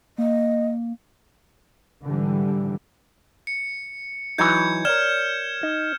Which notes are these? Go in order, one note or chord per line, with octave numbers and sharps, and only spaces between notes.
A#3 D#5
G#2 D3 E3 G3
C#7
E3 F#3 D#4 G6 G#6 C#7
A#4 C#5 D5 F6 G#6 E7
D#4